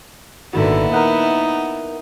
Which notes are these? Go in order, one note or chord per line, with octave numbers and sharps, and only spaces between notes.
G#1 D#2 A#2 D3 D#3 B3 E4 F#4
D#4 A#4 F#5